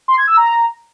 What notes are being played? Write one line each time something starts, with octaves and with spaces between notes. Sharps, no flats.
C6
G#6
E6
A#5